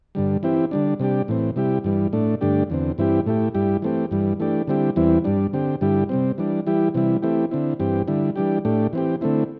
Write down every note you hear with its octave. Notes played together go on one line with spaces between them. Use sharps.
G2 D3 G3
E3 C4 E4 G4
D3 G3 D4
C3 G3 D4 G4
A2 E3 C4
C3 G3 E4 G4
G2 E3 G3
A2 A3 D4
G2 D3 A3 D4 G4
E2 D3 C4
G2 E3 C4 E4 G4
A2 A3 E4 G4
G2 G3 E4 G4
E3 A3 C4 G4
G2 E3 G3
E3 A3 D4 G4
D3 G3 C4 E4 G4
E2 E3 G3 C4 E4
G2 G3 D4
D3 C4 G4
G2 D3 G3 E4 G4
C3 G3 C4
E3 G3 D4
E3 G3 E4 G4
C3 E3 G3 E4
E3 A3 C4 E4 G4
D3 C4 E4
G2 E3 C4 G4
D3 G3 E4
E3 G3 D4 G4
A2 A3 D4 G4
E3 C4 G4
D3 A3 C4 E4